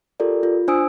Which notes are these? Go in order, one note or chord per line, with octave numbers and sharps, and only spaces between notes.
F4 G4 A4 A#4 D5
F4
D4 C5 G#5 D#6 E6 D7